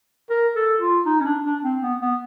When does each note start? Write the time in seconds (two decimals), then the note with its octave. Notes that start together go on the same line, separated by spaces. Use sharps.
0.30 A#4
0.56 A4
0.81 F4
1.06 D#4
1.20 C#4
1.25 D4
1.45 D4
1.63 C4
1.82 B3
2.01 B3